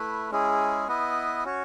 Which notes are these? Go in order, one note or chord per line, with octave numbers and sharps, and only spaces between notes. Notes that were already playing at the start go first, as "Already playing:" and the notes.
Already playing: A3 E4 B4
G#3 C#4 E4 G#4
B3 E4 B4 D#5
C#4 F#4 C#5